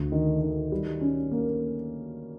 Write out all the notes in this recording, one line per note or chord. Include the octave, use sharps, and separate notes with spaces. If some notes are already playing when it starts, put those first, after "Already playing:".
Already playing: D2
D#3
D#3
G3
C#4
A#3